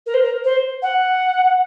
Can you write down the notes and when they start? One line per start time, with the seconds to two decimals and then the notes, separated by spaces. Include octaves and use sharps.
0.06 A#4
0.14 C5
0.22 A#4
0.44 C5
0.82 F#5